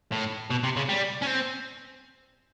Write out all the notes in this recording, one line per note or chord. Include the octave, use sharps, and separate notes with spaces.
A2
B2
C3
C#3
G3
C#4
C4